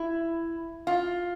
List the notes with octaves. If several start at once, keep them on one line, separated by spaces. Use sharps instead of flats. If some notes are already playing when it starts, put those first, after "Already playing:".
Already playing: E4
F4